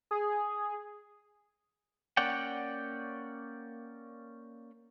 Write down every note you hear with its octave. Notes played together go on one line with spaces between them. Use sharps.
G#4
A#3 C#4 D5 F#5 G5